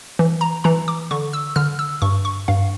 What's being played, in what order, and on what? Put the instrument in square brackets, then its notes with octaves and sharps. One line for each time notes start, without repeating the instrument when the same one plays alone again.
[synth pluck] E3
A#5
E3 A#5
D6
D3 C#6
E6
D3 F6
E6
G2 C#6
C#6
G2 F5